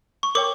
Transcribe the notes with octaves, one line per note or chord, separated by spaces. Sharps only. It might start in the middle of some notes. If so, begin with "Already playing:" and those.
C#6
A#4 C#5 G5 D6